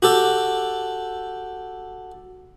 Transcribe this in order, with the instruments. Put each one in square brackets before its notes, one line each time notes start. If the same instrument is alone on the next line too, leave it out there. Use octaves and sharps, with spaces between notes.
[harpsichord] F#4 G4 A4